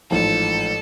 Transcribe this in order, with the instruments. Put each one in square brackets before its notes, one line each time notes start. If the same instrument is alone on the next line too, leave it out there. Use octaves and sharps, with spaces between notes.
[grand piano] A1 G#2 F3 [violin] A4